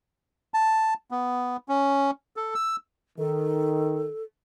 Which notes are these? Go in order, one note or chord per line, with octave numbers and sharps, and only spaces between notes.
A5
B3
C#4
A4
E6
D#3 A4